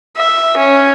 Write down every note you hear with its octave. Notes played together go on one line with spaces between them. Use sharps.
E5
C#4